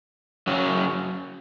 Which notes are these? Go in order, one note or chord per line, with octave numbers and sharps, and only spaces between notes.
F#2 C#3 F#3 C#4